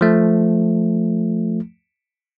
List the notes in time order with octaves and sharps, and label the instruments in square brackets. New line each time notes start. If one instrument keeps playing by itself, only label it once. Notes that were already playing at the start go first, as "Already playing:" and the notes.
[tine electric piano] F3 A3